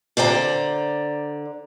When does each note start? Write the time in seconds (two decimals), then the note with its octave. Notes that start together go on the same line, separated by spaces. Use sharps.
0.17 D3 C5 D5 G5 A#5